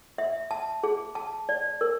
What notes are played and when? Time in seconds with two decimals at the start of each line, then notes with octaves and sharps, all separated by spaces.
0.18 E5
0.51 A5
0.84 G#4
1.15 A5
1.49 D5
1.81 A#4